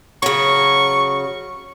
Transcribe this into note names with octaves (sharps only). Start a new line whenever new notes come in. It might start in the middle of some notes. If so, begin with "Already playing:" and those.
C#3 F#3 C#6